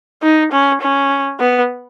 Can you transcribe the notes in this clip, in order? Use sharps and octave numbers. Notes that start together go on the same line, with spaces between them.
D#4
C#4
C#4
B3